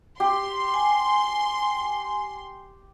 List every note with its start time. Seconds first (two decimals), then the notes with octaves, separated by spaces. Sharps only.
0.20 G4 C6
0.74 G#5